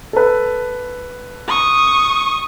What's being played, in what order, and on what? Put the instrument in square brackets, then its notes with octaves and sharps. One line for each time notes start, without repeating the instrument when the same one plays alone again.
[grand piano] A4 B4
[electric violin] C#6 D#6